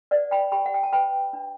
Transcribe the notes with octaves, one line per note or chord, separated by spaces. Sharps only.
B4 D5 F#5
G5 B5
G4 G5 B5
F#5
G5
A5
B4 G5 B5
D4